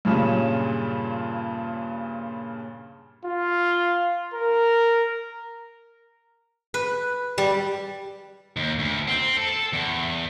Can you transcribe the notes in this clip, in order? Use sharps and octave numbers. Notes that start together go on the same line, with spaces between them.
G2 A#2 C#3 G3 C#4
F4
A#4
B4
G3
D#2
D2
C4
A4
A4
E2